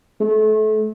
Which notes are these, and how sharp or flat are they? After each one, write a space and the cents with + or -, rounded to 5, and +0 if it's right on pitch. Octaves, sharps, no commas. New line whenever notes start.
A3 -30